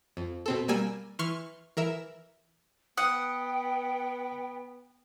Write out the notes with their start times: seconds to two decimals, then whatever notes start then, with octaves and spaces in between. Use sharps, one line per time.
0.17 F2
0.46 B2 C4 A4
0.68 G3 A#3 G#5 E6
1.19 E3 C6 C#6 F6
1.77 E3 A#4 E5
2.98 B3 F#5 G5 D#6